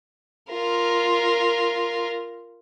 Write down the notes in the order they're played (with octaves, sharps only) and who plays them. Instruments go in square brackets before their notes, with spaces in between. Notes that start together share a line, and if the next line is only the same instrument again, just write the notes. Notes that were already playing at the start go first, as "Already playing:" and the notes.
[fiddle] F4 A#4